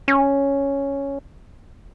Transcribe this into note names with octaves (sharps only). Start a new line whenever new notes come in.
C#4